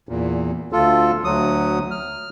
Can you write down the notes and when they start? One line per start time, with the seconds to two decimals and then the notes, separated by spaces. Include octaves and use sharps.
0.09 E2 A#2
0.73 D2 F4 A4
1.24 D2 F#3 D#6
1.91 F6